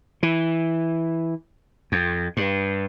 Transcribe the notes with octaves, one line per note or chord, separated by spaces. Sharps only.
E3
F2
G2